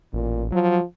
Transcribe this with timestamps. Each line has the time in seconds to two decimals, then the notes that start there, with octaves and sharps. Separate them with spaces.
0.13 A1 A#2
0.52 F3 F#3